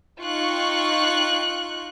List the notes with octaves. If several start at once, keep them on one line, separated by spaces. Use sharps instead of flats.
D#4 F4 G5 C#6 F#6 C#7